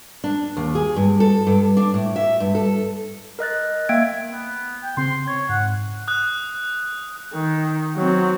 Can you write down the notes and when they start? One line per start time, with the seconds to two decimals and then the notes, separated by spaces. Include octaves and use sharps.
0.24 D4
0.57 D#2
0.75 G#4
0.96 G2
1.20 A4
1.47 G2
1.77 D4
1.94 A2
2.16 E5
2.40 G2
2.55 A4
3.39 A#4 D#5 F#6 A6
3.89 A#3 E5 G5 E6 G#6 D7
4.31 B3
4.83 G5
4.97 C#3 C4 C6
5.28 C#5 G#6
5.49 G#2 F#5
6.08 D#6 F#6
7.34 D#3
7.96 F#3 C4